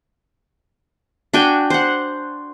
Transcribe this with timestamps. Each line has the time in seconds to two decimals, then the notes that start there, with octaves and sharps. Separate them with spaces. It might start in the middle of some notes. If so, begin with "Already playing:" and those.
1.33 D4 F#4 G5 G#5
1.70 C5 F#5